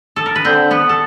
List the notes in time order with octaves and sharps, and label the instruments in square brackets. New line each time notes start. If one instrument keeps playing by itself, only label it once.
[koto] A4
A#4
B4
[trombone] D3 [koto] C4 C5
[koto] B3 B4
A4